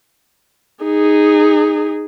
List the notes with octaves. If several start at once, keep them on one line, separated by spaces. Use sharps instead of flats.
D#4 G#4